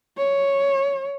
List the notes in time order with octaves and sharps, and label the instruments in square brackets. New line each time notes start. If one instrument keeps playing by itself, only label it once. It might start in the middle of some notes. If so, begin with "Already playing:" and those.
[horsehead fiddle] C#5